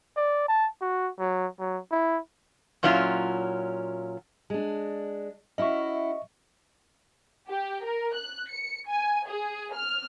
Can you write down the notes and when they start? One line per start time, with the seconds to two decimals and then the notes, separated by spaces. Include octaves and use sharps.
0.17 D5
0.48 A5
0.81 F#4
1.19 F#3
1.59 F#3
1.91 E4
2.83 A#2 F#3 C#4 E4 F4
4.50 G#3 D4
5.58 C#4 E4 F#4 D#5 E5 C#6
7.48 G4
7.83 A#4
8.15 F#6
8.50 C#7
8.88 G#5
9.26 G#4
9.73 F6